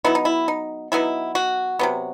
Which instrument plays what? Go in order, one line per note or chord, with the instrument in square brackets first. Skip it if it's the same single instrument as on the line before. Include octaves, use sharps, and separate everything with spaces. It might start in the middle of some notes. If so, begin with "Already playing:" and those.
[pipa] F#3 B3 D#4 E4
D#4
E4
D#4
F#3 B3 D#4 E4
F#4
C3 F#3 B3